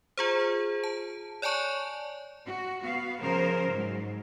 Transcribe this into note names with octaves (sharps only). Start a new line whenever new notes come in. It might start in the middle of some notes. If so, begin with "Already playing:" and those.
F4 G#4 C5
A5
C#5 D5 G#5 A5 C#6
F#4
B3 F#4 F5
C#3 F3 A#4 C5
G#2 F#3